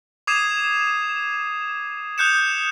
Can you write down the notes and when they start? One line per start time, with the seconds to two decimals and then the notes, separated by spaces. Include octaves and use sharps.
0.27 D6 D#6 G#6 C7 D#7 E7
2.18 D#6 F#6 G6 C#7 E7